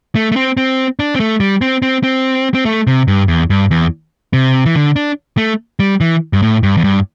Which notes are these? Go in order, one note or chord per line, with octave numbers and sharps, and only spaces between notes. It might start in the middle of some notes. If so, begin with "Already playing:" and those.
A3
A3
C4
C4
D4
C4
A3
G3
C4
C4
C4
C4
A3
C3
G2
E2
G2
E2
C3
E3
D3
D4
A3
G3
E3
G2
A2
G2
E2
G2